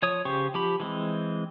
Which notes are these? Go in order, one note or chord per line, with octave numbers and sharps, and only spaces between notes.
F3 C#5 D#6
C#3 G4 C5 C#6
F3 G4 B5
E3 G#3 C4